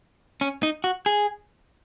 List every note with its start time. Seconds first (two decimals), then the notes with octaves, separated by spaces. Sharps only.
0.41 C#4
0.63 D#4
0.84 F#4
1.06 G#4